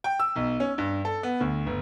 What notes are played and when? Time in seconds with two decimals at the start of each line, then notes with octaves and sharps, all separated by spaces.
0.04 G5
0.19 E6
0.36 B1
0.60 C#4
0.78 G2
1.05 A4
1.23 B3
1.40 D2
1.66 G1